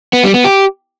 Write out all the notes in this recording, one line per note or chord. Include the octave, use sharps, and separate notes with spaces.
B3
G3
B3
G4